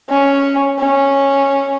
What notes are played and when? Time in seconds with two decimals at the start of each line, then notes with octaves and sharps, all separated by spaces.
0.09 C#4
0.80 C#4